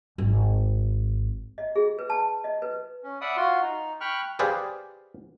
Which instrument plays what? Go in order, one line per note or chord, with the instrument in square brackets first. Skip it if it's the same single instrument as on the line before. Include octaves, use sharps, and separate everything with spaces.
[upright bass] G#1
[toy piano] D#5
G#4
B4
A5
D#5
B4
[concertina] C#4
D5 E5 F#5 B5 D#6
F4 F#4 C6
D#4
G5 B5 C#6 F6 F#6
[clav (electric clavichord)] G4 G#4 B4 C5 D5 F5